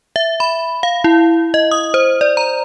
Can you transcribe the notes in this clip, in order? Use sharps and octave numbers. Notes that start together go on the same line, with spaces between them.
E5
B5
F5
E4
D#5
D#6
C5
D5
A#5